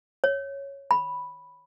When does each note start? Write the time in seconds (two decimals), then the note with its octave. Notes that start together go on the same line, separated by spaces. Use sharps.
0.24 C#5
0.91 B5